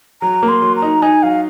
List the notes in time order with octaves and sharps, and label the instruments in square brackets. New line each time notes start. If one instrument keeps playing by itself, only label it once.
[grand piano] F#3 [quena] A#5
[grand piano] A#3
[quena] C6
[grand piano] F#3
[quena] A#5
[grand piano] D#4
[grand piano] D#4 [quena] G#5
[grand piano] F#3 [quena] F5